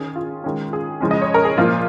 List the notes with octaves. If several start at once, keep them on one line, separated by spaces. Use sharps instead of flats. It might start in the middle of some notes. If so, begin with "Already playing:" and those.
Already playing: D#3 C#4 G#4
F4
D#3 G#3 C#4
G#4
C#3 F3 G#3 C#4
D#5
C#5
A#4
G#4
A#2 F3 A#3 F4